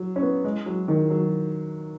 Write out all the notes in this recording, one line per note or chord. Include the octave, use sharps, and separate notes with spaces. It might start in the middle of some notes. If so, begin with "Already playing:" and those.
Already playing: F#3
C#4
B3
G#3
F#3
D#3
F#3